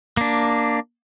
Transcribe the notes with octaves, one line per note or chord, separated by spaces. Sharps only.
A#3 D4